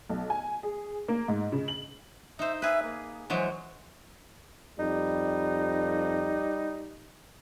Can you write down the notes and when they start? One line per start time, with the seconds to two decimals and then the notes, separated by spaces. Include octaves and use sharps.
0.10 B1
0.30 G#5
0.63 G#4
1.08 A#3
1.28 G#2
1.52 C#3
1.68 F#7
2.39 D#4 C5 E5
2.62 G#4 B4 E5
2.84 A#3
3.30 E3 F#3 G#3 C5
4.79 F2 G3 D#4